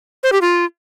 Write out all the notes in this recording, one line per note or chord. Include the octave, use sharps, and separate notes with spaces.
C5
G4
F4